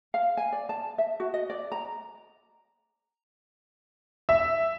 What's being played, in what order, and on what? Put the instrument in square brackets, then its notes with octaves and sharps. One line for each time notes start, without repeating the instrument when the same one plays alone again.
[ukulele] F5
G#5
D5
A5
E5
F#4
D#5
D5
A#5
[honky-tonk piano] E5